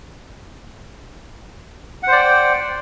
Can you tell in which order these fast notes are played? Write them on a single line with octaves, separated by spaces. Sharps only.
F#5 C5 D5 G5